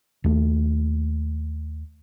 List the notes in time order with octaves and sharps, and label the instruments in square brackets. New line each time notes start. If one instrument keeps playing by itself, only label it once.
[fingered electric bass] D#2 A3